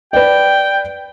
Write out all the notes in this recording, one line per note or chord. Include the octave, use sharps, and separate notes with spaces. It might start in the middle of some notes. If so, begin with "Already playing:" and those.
B4 D5 G5